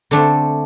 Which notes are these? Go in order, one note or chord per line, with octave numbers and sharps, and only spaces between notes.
D3 A3 C4 D4